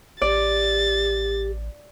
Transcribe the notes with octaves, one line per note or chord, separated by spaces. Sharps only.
A1 G4 D5 A6